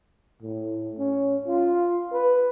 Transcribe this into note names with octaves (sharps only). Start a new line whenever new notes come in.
A2
C#4
F4
B4